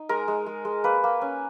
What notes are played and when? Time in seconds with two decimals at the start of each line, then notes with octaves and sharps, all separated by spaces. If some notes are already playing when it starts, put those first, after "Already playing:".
Already playing: D#4
0.09 G#3 A#4
0.28 G#3
0.46 G#3
0.65 G#3
0.84 A#3 B4
1.04 A#3
1.22 C#4